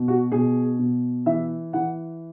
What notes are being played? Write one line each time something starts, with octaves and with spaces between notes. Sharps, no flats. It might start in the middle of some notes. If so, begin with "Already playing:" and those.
Already playing: B2
F#4
B2 G#4
B2
E3 E5
E3 F#5